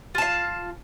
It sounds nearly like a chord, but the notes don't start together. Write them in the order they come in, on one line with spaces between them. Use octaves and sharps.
F4 A5 F5